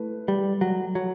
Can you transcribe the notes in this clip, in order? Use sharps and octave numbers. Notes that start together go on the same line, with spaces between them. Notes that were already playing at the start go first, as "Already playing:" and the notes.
Already playing: A3 E4 B4
G3
F#3
F#3